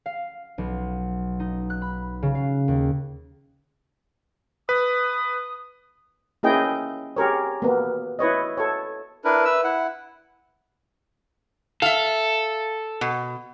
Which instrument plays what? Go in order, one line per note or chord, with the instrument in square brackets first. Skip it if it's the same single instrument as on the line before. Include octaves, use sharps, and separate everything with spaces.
[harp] F5
B1
D#4
F#6
B5
C#3
F5
D#2
[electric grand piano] B4 [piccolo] D#6
[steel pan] A#3 C#4 E4 G#4 D#5 G5
G4 G#4 A#4 C#5
A#3 B3
E4 B4 C#5 D#5
A4 C#5
[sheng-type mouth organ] D4 E4 A#4 B4
B4 E5 E6
E4 F#5
[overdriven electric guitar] A4 [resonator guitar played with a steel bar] E5 F5
[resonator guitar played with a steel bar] B2